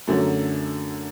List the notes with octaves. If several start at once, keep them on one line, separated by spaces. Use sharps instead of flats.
F#2 D3 F#3 A3